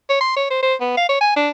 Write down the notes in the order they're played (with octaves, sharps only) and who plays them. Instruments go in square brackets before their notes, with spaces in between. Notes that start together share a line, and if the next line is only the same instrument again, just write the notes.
[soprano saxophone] C#5
C6
C#5
C5
C5
B3
F5
C#5
G#5
D4